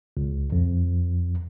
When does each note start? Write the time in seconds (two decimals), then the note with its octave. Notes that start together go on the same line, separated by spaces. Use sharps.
0.17 C#2
0.52 F2